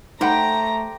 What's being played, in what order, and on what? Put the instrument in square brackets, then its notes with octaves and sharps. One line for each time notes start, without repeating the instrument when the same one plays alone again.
[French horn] A3 [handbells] D#4 F#5 B5 [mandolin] G4 C5 G5 [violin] A#5